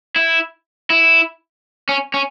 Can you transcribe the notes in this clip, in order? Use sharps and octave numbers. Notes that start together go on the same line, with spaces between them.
E4
E4
C#4
C#4